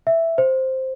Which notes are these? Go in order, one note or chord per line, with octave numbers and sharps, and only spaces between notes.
E5
C5